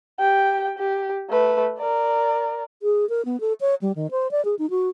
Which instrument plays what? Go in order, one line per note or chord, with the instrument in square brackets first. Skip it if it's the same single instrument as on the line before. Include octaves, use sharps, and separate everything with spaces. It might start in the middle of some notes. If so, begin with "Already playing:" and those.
[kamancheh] G4 G5
G4
A3 B4
A#4 D5
[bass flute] G#4
A#4
B3
A4
C#5
G3
D#3
C5
D5
G#4
D#4
F#4